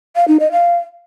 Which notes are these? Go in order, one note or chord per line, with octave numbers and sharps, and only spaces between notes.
F5
D#4
D#5
F5